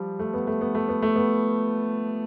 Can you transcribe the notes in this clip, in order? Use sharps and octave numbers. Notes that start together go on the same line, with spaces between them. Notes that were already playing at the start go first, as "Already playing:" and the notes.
Already playing: F3 G3
A3
B3
A3
B3
A3
B3
A3
B3